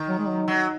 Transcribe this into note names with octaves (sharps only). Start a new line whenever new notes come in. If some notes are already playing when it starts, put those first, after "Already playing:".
Already playing: D#3
F#3
G#3
F#3
F#3